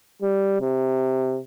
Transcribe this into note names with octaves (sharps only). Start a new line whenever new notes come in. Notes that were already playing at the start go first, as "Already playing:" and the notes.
G3
C3